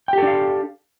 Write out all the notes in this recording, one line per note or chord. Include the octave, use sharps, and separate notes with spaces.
D4 G4 A4 F5 G5